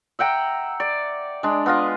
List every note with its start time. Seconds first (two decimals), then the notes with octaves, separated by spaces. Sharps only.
0.19 E5 F#5 G5 A#5
0.80 D5
1.43 G#3 D4
1.66 B3 F4 D#5